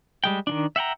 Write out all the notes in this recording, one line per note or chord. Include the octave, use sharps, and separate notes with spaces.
G3 G#3 G5
D#3 F3 D4
E5 F#5 G5 A#5